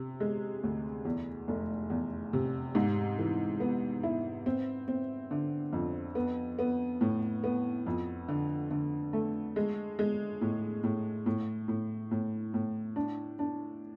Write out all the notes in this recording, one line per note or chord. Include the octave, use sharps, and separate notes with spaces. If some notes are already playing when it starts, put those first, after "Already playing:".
Already playing: C3
G#3
D2
E2
F1
E2
C3
G#2
E3
B3
E4
C4
C4
D3
F2
B3
B3
A2
B3
F2
D3
D3
A3
G#3
G#3
A2
A2
A2
A2
A2
A2
D4
D4